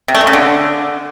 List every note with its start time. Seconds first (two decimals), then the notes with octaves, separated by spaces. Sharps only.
0.08 C3
0.15 A3
0.21 G#3
0.27 C#3
0.33 D3